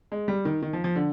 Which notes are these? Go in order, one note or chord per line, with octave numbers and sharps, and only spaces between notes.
G#3
G3
D#3
D#3
F3
F3
D3